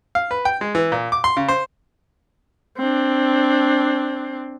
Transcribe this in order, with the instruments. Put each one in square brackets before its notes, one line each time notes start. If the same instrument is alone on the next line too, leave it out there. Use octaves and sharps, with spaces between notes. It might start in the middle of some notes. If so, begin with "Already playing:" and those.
[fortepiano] F5
B4
G5
G#3
E3
A#2
D6
C6
C#3
C5
[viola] C4 D4